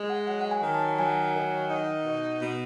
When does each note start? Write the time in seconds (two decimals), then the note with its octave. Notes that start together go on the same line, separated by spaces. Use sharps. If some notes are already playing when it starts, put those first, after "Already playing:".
Already playing: G#3
0.10 F#5
0.27 F#3 F#5
0.41 F#5
0.51 G#5
0.62 D#3
0.74 A5
0.98 F#3 G#5
1.34 D#3
1.69 D#4 F#5
2.04 B2
2.40 B2